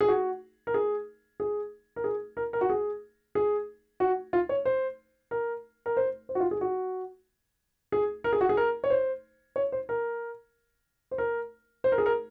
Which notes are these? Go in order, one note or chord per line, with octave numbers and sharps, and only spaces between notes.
G#4
F#4
A#4
G#4
G#4
A#4
G#4
A#4
A#4
F#4
G#4
G#4
F#4
F4
C#5
C5
A#4
A#4
C5
C5
F#4
F4
G#4
F#4
G#4
A#4
G#4
F#4
G#4
A#4
C#5
C5
C#5
C5
A#4
C5
A#4
C5
A#4
G#4
A#4